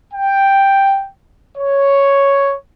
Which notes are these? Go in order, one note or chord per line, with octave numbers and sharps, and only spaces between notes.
G5
C#5